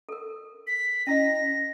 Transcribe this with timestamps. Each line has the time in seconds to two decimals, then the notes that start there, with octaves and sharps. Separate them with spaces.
0.09 A4 A#4
0.67 B6
1.07 C#4 E4 D#5 A#6